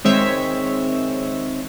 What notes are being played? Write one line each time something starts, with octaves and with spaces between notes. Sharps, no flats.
D#3 G#3 C4 C#5 E5